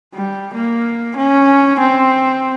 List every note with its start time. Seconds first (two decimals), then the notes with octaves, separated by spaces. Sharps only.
0.14 G3
0.54 A#3
1.16 C#4
1.79 C4